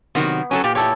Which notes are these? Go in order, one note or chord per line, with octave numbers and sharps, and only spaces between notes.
C3 D#3 F#3 B3
F#3 C#4 G4 A4
A#2 G4
E4 G4 A4 C#5